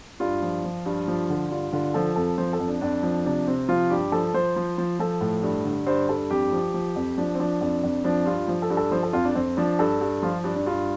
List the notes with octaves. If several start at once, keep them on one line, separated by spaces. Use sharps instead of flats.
G2 F4
F3
F3
G2
F3
D3
G2 F4
D3 F4
F3 A4
F2 A4
F3 C5
A4
F2
D4
F2 D4
F3
C3 D4
C3 C4
F3 F4
G2 G4
F3 A4
F3 C5
F3
F3
F3 A4
A2
G2
D3
G2 C5
G2 A4
F2 G4
F3
F3
F2
F3 D4
C4
F3 D4
F2 D4
F2
F3 D4
G2 F4
F3
A4
G2
A4
F3 C5
A4
F2 F4
D4
F2 C4
F3 D4
G2 A4
G2
F3 F4
G2 D4
D4
G2 F4